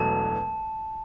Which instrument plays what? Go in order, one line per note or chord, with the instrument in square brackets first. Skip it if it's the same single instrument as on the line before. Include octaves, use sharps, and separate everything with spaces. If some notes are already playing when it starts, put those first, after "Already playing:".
Already playing: [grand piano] E1 E2 B2 F#3 A3 [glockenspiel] A5